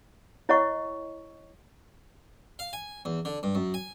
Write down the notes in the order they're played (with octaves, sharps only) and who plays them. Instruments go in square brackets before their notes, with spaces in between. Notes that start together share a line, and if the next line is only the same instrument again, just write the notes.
[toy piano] E4 C#5 D#5 F#5 C#6
[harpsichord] F5
G#5
E2
D3
G2
F#2
G#5